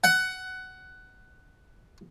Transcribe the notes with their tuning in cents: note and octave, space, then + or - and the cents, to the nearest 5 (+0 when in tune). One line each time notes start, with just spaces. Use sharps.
F#5 +15